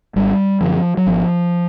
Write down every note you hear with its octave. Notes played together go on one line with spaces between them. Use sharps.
G#1 G3
F#2 D3 F3
F#3
G#1 F3